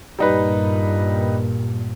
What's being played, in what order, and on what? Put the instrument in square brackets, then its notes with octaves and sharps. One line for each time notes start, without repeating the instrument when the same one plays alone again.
[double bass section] G2 A#2 [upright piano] G3 D#4 B4